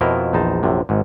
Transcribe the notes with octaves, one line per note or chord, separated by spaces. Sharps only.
F2 B2 F3 E4 A#4 D#5
A#1 E2 D#4 C5 A5
A#1 F#2 C3
G#1 G#2